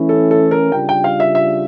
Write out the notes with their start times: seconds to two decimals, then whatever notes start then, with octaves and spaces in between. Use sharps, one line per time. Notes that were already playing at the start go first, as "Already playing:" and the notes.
Already playing: E3 A3 C#4 E4
0.09 A4
0.31 A4
0.51 A#4
0.72 C#3 G3 D4 F4 G5
0.89 G5
1.04 F5
1.20 E5
1.35 E5